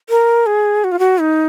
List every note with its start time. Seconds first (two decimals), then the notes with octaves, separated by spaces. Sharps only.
0.09 A#4
0.46 G#4
0.84 F#4
0.92 F4
0.99 F#4
1.20 D#4